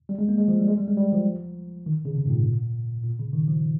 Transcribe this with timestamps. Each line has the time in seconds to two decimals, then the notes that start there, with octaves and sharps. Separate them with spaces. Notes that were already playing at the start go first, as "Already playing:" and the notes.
0.09 G3
0.19 G#3
0.29 A#3
0.38 G#3
0.48 F3
0.59 G3
0.68 G#3
0.78 G3
0.88 G#3
0.97 G3
1.13 F3
1.86 D#3
2.05 C#3
2.15 C3
2.26 G#2
2.30 A#2
3.04 A#2
3.19 C#3
3.33 D#3
3.48 F3